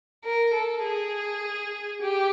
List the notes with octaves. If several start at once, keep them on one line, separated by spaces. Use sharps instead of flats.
A#4
A4
G#4
G4